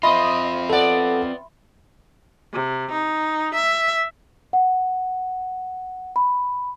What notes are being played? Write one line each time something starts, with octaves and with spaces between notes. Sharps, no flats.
C4 F4 D#5 E5 B5 C6
B3 A4 D5 F#5
C3
D#4
E5
F#5
B5